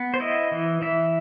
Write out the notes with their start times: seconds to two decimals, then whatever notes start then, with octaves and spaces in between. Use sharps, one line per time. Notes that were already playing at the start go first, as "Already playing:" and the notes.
Already playing: B3
0.14 C5
0.20 E4 D#5
0.52 E3
0.82 E3 E5